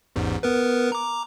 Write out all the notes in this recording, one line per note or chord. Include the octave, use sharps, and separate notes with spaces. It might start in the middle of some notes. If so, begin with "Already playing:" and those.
A1 E2 G#2
B3 A#4 B4
A#5 D6